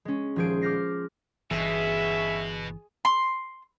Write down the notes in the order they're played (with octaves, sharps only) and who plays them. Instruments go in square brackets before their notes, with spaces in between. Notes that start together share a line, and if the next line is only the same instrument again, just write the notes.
[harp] G#3 C#4
D#1 F3 G#4 C5 D7
D6 F6 G6 A#6 C7
[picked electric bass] G1 E3 [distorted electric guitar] B2 [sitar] G#3 [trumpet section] C#4 E5
[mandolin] C6